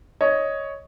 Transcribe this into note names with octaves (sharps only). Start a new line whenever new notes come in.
C#5 D#5